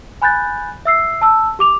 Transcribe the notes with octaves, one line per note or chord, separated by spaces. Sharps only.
G#5 B5 F#6 G6 A6
E5 E6 C7
A5 E6
G4 D6 F7